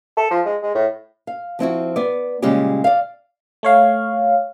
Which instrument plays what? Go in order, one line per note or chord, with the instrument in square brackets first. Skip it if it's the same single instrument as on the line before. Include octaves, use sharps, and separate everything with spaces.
[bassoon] A4
F3
G#3
G#3
A2
[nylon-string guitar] F5
F3 C4 E4 F#4
B3 D5
A#2 C#3 G3 G#3 C#4 G4
D5 F5
[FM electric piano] A3 C#5 F5